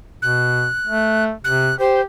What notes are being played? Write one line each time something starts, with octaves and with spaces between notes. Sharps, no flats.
B2 F#6
A3
C3 F#6
G4 C5